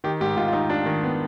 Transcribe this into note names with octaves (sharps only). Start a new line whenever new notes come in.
D#3 G4
G#2 G4
G#2 F4
F4
D#3 D#4
D4 F4
D#3
B3